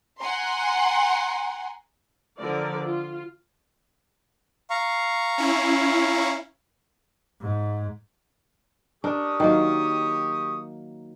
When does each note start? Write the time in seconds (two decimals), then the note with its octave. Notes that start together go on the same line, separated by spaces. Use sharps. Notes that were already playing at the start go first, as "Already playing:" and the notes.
0.19 F#5 G#5 A#5 C6
2.40 D3 F3 A#4 D5
2.84 F4
4.70 F5 A#5 C#6
5.38 C#4 E4
7.41 G#2
9.04 D4 G4 A#4 C#6 D#6
9.40 D#3 F#3 A#3